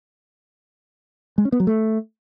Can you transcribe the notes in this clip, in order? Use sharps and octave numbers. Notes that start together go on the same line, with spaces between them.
G#3
C#4
B3
F#3
A3